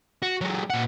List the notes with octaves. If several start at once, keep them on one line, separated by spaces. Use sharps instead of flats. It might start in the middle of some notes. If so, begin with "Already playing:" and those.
F#4
F#3 G#3
A#2 F#5